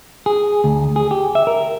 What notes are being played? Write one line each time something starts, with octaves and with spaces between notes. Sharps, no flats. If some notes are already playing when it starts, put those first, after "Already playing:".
G#4
D2
G#4
G4
E5
A#4